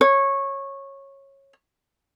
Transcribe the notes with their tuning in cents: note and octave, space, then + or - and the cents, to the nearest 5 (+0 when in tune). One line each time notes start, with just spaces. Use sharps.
C#5 -15